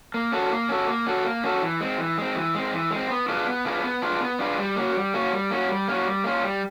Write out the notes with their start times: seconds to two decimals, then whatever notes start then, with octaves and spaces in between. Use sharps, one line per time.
0.14 A#3
0.32 C#4 F#4 A4
0.51 A#3
0.69 C#4 F#4 A4
0.87 A#3
1.07 C#4 F#4 A4
1.24 A#3
1.44 C#4 F#4 A4
1.62 E3
1.81 G#3 C4
1.98 E3
2.18 G#3 C4
2.35 E3
2.55 G#3 C4
2.73 E3
2.91 G#3
2.96 C4
3.10 B3
3.29 D4 F4 G#4 B4
3.47 B3
3.65 D4 F4 G#4 B4
3.84 B3
4.02 D4 F4 G#4 B4
4.21 B3
4.39 D4 F4 G#4 B4
4.58 G3
4.76 A#3 C#4 F#4
4.95 G3
5.14 A#3 C#4 F#4
5.32 G3
5.50 A#3 C#4 F#4
5.68 G3
5.88 A#3 C#4 F#4
6.06 G3
6.24 A#3 C#4 F4
6.43 G3